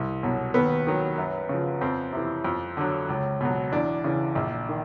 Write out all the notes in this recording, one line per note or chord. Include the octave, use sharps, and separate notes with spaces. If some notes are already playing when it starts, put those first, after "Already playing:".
Already playing: C2
B2 F#3
D#2 B3
D#3 F#3
F#2
C#3 F3
F2 C4
C3 E3
F2
D3 F#3
C#2
B2 F#3
E2 D4
C#3 E3
A#1
D#3